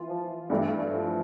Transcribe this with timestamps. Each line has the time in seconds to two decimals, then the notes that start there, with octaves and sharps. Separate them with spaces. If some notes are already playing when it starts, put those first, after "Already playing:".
Already playing: E3 F4
0.09 F3
0.50 G2 E3 G3 A3 D4
0.92 F3